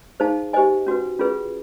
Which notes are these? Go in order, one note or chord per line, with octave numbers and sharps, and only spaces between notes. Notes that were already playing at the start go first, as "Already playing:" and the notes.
D#4 G#4 C5 F5 A5
G4 C5 D#5 G#5
C#4 F#4 B4
C#4 F4 G#4 B4